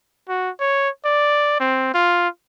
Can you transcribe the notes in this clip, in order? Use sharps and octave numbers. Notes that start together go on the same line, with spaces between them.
F#4
C#5
D5
C4
F4